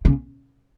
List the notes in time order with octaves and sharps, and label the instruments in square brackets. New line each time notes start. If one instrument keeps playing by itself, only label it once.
[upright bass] C#3